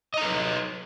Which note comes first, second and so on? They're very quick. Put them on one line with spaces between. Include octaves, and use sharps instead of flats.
D#5 A#5 A4 B4